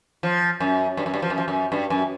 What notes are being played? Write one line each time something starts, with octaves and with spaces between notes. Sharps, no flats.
F3
F#2
G2
F#2
G2
F3
F#2
F3
F#2
G2
F#2